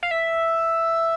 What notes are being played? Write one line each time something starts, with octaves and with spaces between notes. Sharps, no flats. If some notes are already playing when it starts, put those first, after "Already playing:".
F5
E5